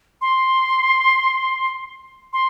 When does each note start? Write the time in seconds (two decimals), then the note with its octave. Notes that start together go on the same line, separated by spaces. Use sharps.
0.21 C6
2.33 C6